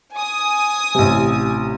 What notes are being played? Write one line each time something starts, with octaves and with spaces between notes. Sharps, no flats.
G#5 D#6
A1 C3